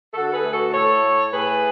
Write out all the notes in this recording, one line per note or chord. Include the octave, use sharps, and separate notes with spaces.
D3 F#4 A4
A4
G#4 B4
A3
F#4 A4
A2 A4 C#5
A3
A2 G#4 B4